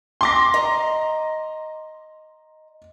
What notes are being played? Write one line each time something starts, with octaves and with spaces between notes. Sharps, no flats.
C6 D6 A#6
D#5 A#5